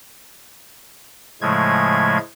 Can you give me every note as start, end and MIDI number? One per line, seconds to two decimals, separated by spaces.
1.42 2.18 45
1.42 2.18 49
1.42 2.18 53
1.42 2.18 56
1.42 2.18 57
1.42 2.18 92